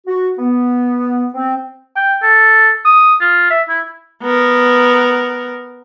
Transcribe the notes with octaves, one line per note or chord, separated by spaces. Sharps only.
F#4
B3
C4
G5
A4
D#6
F4
E5
E4
B3 A#4